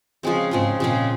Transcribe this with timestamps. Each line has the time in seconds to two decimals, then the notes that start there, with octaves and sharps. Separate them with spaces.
0.23 C#3 F3 G#3 C4
0.51 G#2 C#3 F3 G#3 C4
0.80 A#2 C#3 F3 G#3 C4